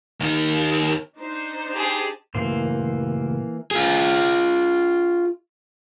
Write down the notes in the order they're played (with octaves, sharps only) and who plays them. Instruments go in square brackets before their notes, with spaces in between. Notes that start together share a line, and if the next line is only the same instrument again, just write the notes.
[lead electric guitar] D#2 D#4
[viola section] D4 D#4 C5
[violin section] G4 G#4 A5
[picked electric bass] A#2 C#3 A3 [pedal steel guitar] E3 A#3 C5
[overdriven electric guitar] F4 G#4